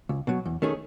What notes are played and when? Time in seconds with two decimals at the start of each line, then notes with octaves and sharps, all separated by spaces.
0.09 C#2
0.27 B2 F#3
0.45 E2
0.62 D#3 A3 C#4 G#4